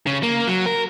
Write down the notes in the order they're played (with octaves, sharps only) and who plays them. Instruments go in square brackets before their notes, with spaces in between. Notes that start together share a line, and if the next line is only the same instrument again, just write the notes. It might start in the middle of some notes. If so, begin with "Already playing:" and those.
[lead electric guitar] C#3
A#3
F#3
A#4